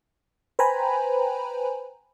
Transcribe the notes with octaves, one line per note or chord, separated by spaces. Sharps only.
B4 C5 G5 G#5 A#5 B5